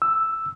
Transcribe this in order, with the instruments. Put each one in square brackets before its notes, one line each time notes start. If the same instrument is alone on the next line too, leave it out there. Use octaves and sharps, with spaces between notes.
[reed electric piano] E6